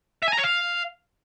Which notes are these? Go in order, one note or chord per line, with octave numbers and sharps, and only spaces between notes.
E5
G#5
A#5
C#5
F5